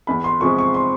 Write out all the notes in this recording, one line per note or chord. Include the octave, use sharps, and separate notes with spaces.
E2 B5
C6
C3 F3 G#3 C#6
C#6
C6